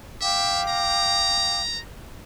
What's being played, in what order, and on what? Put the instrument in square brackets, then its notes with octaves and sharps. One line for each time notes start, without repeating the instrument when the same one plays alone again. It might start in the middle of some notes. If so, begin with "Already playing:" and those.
[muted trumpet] E5 [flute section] F5 G5 D6
[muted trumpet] A#5